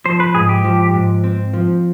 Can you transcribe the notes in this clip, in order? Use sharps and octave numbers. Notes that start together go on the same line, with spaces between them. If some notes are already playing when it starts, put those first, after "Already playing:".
F3 C5
B4
G#2 G#4
G4
F3
G#2
C4
F3